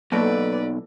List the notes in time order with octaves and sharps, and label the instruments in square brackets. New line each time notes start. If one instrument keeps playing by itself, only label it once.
[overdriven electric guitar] B1 [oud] E3 F#4 A4 [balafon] A#3 [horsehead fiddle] B4 D5